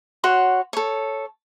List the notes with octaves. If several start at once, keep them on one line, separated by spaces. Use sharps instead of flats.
F#4 C#5 F#5 C6
A4 C#5